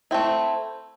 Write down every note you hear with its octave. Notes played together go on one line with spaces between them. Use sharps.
A3 C4 E4